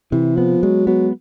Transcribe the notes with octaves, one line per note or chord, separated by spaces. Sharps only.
C3 E3
F3 B3
F#3 G#3
F#3 B3